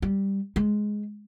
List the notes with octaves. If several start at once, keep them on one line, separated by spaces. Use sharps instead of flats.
G3
G#3